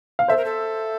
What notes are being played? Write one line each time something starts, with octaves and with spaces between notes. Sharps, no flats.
F5
A4 C5 E5
A#4
A4